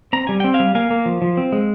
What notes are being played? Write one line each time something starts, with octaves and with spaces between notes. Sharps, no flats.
C4 A#5
G3 G#5
C4 G5
F5 G#5
G3
A#3 F5 G#5
A#3
F3
F3
C4
G#3